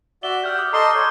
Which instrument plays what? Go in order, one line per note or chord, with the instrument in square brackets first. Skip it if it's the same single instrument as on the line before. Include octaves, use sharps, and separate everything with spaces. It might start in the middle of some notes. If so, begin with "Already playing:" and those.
[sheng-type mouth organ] F#4 D5 E5 [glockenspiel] G7
[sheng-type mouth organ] G4 F#5 [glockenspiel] F6 G6
[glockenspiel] D6 D#6 F6
[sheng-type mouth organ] A4 D#5 C6 [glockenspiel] A#5 D6 C7
[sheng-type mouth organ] C#5 [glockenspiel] C6 G6